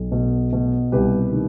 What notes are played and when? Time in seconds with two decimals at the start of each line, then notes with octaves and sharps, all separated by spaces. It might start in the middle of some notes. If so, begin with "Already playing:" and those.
Already playing: B1
0.12 B2
0.53 B2
0.92 C2 G4 B4
1.32 D#3